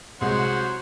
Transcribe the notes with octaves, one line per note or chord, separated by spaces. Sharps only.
C2 F#3 G#3 C5 F#5